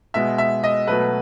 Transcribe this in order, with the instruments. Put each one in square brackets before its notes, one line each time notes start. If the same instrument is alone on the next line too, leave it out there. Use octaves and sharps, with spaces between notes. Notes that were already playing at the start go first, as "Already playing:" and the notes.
[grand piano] B2 G#3 B3 E5
E5
D#5
B2 F#3 A3 B4